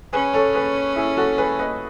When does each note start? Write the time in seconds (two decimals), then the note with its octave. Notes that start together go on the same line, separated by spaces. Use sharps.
0.13 C#4 G#4 B4
0.33 A4 C#5
0.54 G#4 B4
0.96 E4 G#4
1.17 F#4 A4
1.38 G#4 B4
1.59 B4 D#5